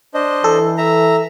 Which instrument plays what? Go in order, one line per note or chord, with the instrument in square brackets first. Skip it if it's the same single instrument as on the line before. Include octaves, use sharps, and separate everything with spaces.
[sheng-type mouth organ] D4 C5 D#5
[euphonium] E3 [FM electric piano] A4
[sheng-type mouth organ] E5 A#5